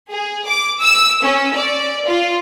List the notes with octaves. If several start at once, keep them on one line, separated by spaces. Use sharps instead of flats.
G#4
D6
E6
C#4
D5
F4